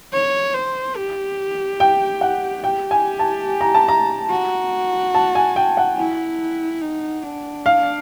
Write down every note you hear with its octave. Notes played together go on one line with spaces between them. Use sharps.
C#5
C5
G4
G5
F#5
G4 G5
G#5
A5
A#5
A5
A#5
F#4
A5
G#5
G5
F#5
E4
D#4
D4
F5